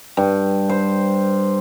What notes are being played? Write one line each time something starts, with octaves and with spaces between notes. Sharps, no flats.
G2
C5